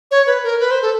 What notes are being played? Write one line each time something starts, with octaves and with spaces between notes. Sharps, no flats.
C#5
B4
A#4
B4
C5
A4